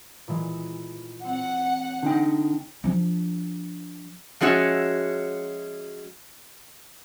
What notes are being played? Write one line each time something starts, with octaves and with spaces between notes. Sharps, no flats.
A#2 E3 G#3
C4 F#5
D3 D#4 G5
F3 D4
F3 G#3 C#4 F#4 E5